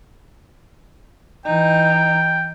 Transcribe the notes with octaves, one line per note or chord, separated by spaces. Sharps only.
E3 D#4 G5